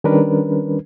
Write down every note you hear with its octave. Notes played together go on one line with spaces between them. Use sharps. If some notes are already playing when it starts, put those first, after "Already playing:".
D#3 G3 C#4 D4 A#4 B4